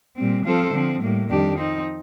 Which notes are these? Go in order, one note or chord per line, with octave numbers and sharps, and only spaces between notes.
A#2 G3 C4
F3 C4 F4 A4 C5
D3 F3 C4
A2 G3 A#3
F2 D#3 G3 D4 G4
F3 C4 D#4